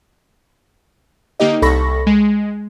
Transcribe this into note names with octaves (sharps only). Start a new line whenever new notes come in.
D3 A#3 D#4 G4 D#5
C2 A4 B5 C#6 A#6
G#3